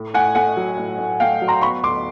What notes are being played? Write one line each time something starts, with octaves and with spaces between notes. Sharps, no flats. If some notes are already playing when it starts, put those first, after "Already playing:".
Already playing: A2
A2 F#5 G#5
A3 F#5 G#5
F#3
A2
A2
A3 F5 G5
F#3
A#5 C6
B3 B5 C#6
D2 C6 D6